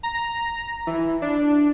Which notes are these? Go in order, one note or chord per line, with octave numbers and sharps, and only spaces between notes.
A#5
E3
D4